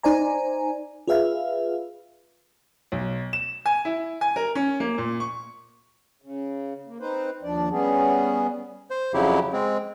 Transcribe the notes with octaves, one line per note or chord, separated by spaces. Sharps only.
D#4 C5 D5 G#5 A#5
F4 G#4 B4 E5 F5
B1
E7
G#5
E4
G#5
A#4
C#4
A#3
A#2
C#6
C#3
A#3
C4 D#4 B4 C5
D#2 F3 D4 D5
G3 B3 C#4 G#4
C5
F2 C#3 F#3 E4 G4
G#3 C4